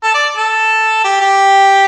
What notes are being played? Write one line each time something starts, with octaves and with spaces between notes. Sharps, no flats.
A4
D5
A4
G4
G4